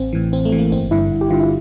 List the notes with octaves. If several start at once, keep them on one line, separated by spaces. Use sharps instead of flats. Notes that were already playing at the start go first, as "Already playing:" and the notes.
Already playing: A1 C4
A2 E3
A1 C4
A3
A2 E3
A#3
G1 C4
G2 D3 E4
G1
G4
G2 D3 F4
E4